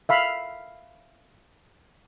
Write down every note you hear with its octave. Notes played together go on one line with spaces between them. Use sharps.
E5 F5 B5